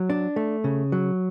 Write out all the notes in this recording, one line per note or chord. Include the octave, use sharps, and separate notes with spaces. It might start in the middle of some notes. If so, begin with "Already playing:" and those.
Already playing: F#3
D4
A3
C#3
F#3